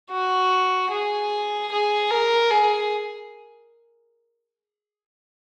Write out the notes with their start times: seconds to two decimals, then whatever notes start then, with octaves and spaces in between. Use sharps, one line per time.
0.11 F#4
0.90 G#4
1.71 G#4
2.10 A#4
2.50 G#4